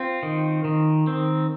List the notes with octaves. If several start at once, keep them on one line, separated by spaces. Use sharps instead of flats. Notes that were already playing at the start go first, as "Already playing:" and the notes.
Already playing: C4 F4
D#3
D#3
C4